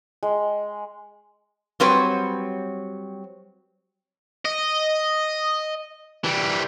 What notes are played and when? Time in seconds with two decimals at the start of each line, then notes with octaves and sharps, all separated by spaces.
0.23 G#3
1.80 F#3 G3 C4 B4 C#5
4.45 D#5
6.24 E3 G3